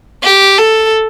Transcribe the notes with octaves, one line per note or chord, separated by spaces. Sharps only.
G4
A4